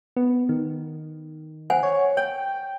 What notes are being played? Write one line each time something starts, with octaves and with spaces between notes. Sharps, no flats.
B3
D#3
C5 F#5 G#5
C#5
C#5 G5